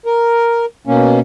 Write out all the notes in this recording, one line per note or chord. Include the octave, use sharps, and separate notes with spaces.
A#4
B2 A#3 C#4